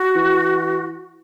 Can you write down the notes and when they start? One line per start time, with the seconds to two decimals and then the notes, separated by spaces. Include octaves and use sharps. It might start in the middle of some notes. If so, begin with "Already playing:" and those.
Already playing: F#4
0.15 E3